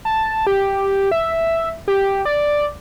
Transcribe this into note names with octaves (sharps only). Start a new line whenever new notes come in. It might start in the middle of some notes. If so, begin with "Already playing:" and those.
A5
G4
E5
G4
D5